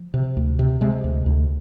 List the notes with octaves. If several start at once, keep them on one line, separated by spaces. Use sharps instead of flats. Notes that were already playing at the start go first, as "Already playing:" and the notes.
Already playing: F3
C3
D2
C3
C3 G#3
D2
D2